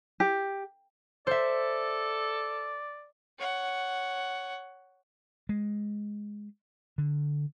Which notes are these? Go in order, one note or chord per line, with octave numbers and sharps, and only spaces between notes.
G4
A4 C5 D5 E5
C#5 F#5
G#3
D3